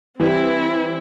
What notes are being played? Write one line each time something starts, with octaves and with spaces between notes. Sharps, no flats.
E3 G3 C4 E4 G4